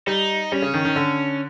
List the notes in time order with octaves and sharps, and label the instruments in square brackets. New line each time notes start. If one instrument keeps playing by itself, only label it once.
[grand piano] G3 [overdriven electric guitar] D#4
[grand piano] G3 [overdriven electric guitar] C#4
[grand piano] C#3
D#3
D#3
D3